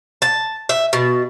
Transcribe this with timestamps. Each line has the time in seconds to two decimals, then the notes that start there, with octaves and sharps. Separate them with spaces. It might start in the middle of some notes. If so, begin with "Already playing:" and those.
0.22 A5
0.69 E5
0.93 B2